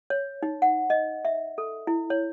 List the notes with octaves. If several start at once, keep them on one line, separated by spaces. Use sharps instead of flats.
C#5
D#4
F#5
D#5
E5
A4
E4
C#5